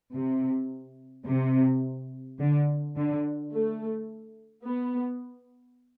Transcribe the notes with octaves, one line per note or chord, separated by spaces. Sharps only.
C3
C3
D3
D3
A3
B3